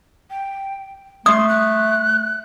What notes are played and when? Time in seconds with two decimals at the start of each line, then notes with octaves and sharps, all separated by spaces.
0.30 G5
1.26 A3 C6 D#6
1.49 F#6